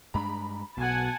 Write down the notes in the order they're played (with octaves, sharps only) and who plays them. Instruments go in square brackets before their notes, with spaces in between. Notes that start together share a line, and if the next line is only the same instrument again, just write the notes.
[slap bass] G2 G#3 D4 [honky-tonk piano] A#5 B5
[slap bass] B1 [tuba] B2 [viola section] F#5 G#5 A5